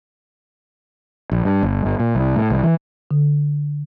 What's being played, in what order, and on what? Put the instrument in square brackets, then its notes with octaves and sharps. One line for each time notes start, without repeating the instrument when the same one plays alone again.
[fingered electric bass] A#1
G2
G1
G1
A#2
C2
A2
C2
E3
[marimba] D3